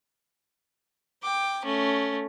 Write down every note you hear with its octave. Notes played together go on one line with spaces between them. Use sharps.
G5 D6
A3 C#4